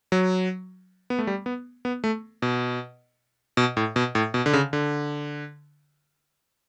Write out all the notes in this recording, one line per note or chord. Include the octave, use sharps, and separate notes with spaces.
F#3
B3
A3
G3
B3
B3
A3
B2
B2
A2
B2
A2
B2
D3
C#3
D3